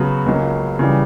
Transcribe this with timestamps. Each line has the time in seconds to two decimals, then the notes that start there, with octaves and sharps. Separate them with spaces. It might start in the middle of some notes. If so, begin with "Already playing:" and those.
Already playing: C#3 F#3 B3 F#4 B4
0.26 C#2 C#3 F#3 A#3
0.79 C#3 E3 G3